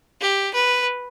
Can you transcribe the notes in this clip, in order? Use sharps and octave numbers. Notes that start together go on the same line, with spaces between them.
G4
B4